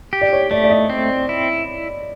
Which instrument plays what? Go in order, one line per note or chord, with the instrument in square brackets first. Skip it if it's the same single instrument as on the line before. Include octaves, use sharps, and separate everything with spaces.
[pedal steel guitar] G4
[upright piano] D5
C#5
[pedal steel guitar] A3 [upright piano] D5
[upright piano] D5
D#5
[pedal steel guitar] C4
E4